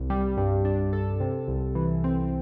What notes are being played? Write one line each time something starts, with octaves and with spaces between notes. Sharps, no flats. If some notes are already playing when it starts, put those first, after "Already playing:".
Already playing: C2
G3
G2
D4
A4
C3
C2
E3
C4